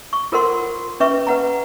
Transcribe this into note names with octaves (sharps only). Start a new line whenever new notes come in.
C#6
F4 A4 A#4 C5 F#5 C6
C#4 B4 E5 C#6
B4 F#5 A#5